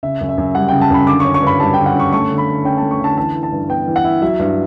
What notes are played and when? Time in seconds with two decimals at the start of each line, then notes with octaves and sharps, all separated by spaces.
0.03 C#3 E5
0.21 F#2
0.29 E5
0.38 F#2
0.55 G3 F#5
0.68 C#3 G5
0.81 A5
0.90 F#2 B5
1.07 D3 D6
1.20 C#6
1.25 C#4
1.34 C#6
1.42 G2 B5
1.60 G3 A5
1.74 D3 G5
1.86 F#5
1.95 C#4 C#6
2.13 A3 C#6
2.30 D3
2.38 B5
2.47 D3
2.65 C#4 G5
2.77 A5
2.82 A3
2.91 C#6
3.00 D3 A5
3.17 E3 A5
3.35 E4
3.43 A5
3.52 G2
3.69 B3 G5
3.87 E3
3.96 F#5
4.04 E4
4.22 F#3 E5
4.39 G2